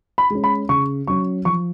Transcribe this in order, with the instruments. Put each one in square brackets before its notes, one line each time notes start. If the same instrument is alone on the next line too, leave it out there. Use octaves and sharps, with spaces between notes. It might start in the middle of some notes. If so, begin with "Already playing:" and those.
[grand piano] B5
G#3 C#4
B5
C#3 C#6
F#3 C#4 C#6
F3 C#6